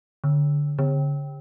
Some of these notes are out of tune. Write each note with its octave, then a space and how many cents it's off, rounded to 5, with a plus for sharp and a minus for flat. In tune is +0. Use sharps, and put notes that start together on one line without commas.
D3 -5
D3 -35